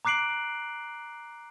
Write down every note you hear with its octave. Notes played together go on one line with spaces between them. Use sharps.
A#5 D6 F#6 C7 D7 F#7